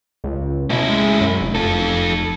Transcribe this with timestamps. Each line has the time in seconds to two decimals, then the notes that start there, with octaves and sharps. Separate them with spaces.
0.24 C#2
0.70 B2 C#4 E4
0.89 G#3
1.21 F#2
1.41 F1
1.55 F4 A4